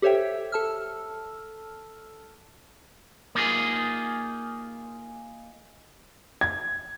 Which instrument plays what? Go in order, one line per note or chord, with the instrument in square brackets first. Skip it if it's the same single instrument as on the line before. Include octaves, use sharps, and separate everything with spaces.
[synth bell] G4 A4 C5 C#5 E5 G5
A4 A5 E6 F6
[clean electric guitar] A#3 D#4 F4 G#4
[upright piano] G#6